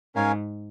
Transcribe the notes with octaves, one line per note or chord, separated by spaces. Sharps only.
G#2 C#4 A#4 C#5 F5 G#5